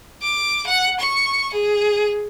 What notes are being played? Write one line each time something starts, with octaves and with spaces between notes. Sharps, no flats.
D6
F#5
C#6
G#4